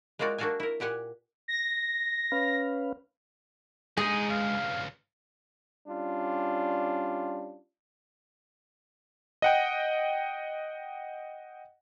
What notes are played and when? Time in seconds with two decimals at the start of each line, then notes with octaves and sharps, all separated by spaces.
0.19 G#3 A#3 F4 F#4 D5
0.38 A#3 D4 F#4 A4 F5 G#5
0.60 E4 A#4
0.80 A#2 G4 F#5 G#5
1.48 A#6
2.32 C#4 B4 F5
3.97 G2 G#3 D#4 G#4
4.30 C#2 G2 F5
5.88 G3 C#4 D4 F4
9.42 D#5 F#5 G5